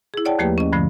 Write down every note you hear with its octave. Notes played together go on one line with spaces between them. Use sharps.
E4 G#4
C#5 D5 F#5 G5 A5
D#2 F3 A3 A#3 G4 B4
C#4 D#5
G2 D3 F3 A3